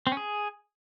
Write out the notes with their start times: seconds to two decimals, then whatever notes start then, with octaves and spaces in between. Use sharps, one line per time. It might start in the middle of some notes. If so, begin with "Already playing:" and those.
0.07 C4
0.12 C#4
0.17 G#4